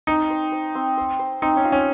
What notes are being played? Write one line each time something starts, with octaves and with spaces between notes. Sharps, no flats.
C4 D#4
C5
C5
C4
C5
C5
C4 D#4
C#4
F4
C#4